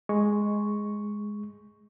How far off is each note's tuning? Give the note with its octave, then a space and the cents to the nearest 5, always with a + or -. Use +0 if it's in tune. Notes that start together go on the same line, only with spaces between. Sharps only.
G#3 +0 C#6 +0